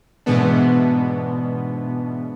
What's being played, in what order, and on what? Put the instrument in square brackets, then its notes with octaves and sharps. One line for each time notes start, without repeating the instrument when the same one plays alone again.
[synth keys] G#2 B2 E3 G#3 B3 D4